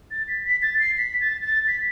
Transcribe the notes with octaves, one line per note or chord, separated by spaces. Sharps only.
A6
B6
B6
A6
C7
B6
A6
A6
B6